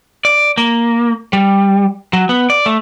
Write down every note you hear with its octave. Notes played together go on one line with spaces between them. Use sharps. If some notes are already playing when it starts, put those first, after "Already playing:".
D5
A#3
G3
F#3
B3
D5
A3